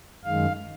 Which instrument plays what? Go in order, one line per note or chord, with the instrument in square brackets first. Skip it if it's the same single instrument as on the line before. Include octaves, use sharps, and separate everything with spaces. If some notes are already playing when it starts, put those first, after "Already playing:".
[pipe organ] F#2 D#3 G#3 F5